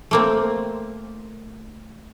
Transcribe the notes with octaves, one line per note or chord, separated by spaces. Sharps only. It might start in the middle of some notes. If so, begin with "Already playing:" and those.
A3 A#3 C4